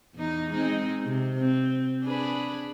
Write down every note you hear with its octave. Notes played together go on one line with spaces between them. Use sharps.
E2 D#4
G#3 C4 D#4
C3
C4
D4 G#4 B4